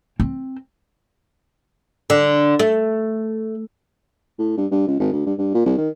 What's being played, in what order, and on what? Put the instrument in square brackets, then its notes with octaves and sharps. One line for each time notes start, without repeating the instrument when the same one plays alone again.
[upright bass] C4
[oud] D3
A3
[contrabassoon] A2
G2
G2
C#2
G#1
D2
G2
G2
A#2
C2
D#3